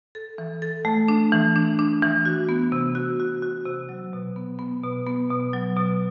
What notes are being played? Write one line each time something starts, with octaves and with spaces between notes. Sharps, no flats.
A4
E3
A4
A3
D4
E3
D4
D4
E3
F#4
B3
C3
F#4
F#4
F#4
C3
F#3
B2
B3
B3
B2
B3
B2
F#3
B2